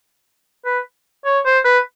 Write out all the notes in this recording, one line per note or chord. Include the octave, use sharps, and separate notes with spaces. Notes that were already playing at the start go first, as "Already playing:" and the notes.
B4
C#5
C5
B4